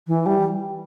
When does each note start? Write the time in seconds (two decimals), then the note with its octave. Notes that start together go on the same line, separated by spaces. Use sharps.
0.07 E3
0.26 G3